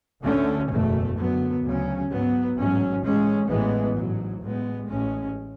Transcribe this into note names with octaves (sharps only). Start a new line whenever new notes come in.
D2 D3 A3 C#4
F#1 E2 B2 A3
F#2 D3 F#3 B3
D2 C#3 F#3 C#4
G#2 F#3 B3
A1 G#2 F#3 C#4
A1 A2 G#3 C#4
A1 A2 E3 G#3 B3
A1 G#2 F#3
A1 A2 G#3 B3
A1 A2 G#3 C#4